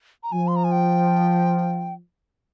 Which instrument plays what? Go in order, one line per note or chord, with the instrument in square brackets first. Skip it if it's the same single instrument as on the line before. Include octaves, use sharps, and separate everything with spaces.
[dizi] A#5
[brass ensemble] F3 [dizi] G#5
[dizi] C6
A#5
G#5
G5